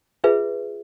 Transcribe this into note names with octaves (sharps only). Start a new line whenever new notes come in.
F4 G#4 B4 E5